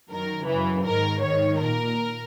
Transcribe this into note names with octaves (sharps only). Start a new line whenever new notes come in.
F#2 D#3 A#4
F#2 C#3 E3
G#2 D#3 A#4
G#2 D#3 C#5
A#2 A#4